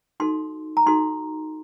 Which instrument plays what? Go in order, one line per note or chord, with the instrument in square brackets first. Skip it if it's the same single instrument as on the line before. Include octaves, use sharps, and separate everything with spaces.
[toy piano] D#4 F#4 A4 C6
A#5
D#4 F#4 A4 C6